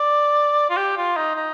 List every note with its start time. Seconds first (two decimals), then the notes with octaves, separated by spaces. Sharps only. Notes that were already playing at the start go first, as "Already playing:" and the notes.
Already playing: D5
0.70 F4
0.77 G4
0.97 F4
1.17 D#4
1.36 D#4